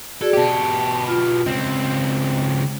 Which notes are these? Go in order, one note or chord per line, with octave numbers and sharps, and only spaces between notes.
F#4 G#4 A4 D5
B2 G4 D#5 A5
F4
C#2 C4 D#5